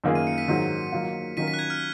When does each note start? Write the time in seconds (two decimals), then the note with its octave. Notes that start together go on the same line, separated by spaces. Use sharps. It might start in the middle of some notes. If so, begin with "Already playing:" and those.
0.04 F#2 D#3 A#3 F4 G#4
0.15 D#7
0.27 C#7
0.38 B6 D#7
0.48 G#2 D#3 F#3
0.92 D#3 F#3 A#3 F4
1.37 D#3 F#3 C#4 F4 A#4 B6 D#7
1.48 B6
1.54 F#6
1.59 G#6
1.70 F6